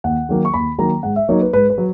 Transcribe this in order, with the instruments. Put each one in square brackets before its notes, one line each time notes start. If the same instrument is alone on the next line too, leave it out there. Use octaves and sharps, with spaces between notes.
[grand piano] D#2 F#5
D#3 F#3 A#3
C#6
D#2 B5
D#3 F#3 A#3 A#5
G#2 F#5
E5
F#3 A#3 D#4 C#5
B4
G#2 B4
B4
F#3